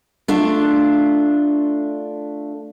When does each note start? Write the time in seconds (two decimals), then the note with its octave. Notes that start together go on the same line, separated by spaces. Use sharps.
0.28 A3 D4 F4